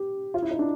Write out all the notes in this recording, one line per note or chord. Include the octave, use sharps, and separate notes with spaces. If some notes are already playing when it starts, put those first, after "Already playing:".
Already playing: G4
F4
E4
D#4
D4